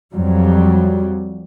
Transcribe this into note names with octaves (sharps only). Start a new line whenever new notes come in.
F2 F#3 G3